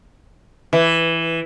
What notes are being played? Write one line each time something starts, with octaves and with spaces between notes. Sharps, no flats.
E3